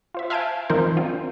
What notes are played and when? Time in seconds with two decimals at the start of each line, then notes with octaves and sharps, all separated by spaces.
0.14 F4 C5 E5
0.30 E5 F5 G#5 A5 G6 D7
0.69 E3 F3 C4 D#4 A#4 C5
0.97 C4 D4 F4